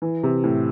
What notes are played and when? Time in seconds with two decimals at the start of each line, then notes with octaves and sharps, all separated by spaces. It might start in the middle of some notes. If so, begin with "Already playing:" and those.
0.02 E3
0.23 C3
0.44 A2